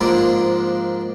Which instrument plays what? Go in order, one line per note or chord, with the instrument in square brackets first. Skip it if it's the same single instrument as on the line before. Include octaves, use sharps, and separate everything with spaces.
[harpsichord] G#2 F3 A#3 D4